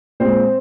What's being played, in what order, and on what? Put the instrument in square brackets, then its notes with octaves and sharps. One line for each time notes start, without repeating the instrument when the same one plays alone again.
[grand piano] A#2 G#3 C4 C5